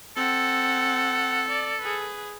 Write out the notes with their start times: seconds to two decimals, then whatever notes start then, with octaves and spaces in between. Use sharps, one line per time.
0.17 C4 A4 F#5
1.49 D5
1.82 G#4 B4